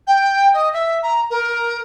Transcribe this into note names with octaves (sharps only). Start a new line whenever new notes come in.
G5
D#5
E5
A#5
A#4